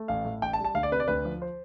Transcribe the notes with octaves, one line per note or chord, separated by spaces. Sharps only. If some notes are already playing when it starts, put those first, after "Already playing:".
Already playing: A3
A1 F5
A2
A1 G5
A5
G3
A5
D2 F5
D5
C3 B4
D5
D2 B4
F3
C5